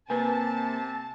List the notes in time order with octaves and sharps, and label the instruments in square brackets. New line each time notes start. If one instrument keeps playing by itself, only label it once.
[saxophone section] C3 [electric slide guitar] A#3 G#5 [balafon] B4 [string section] A5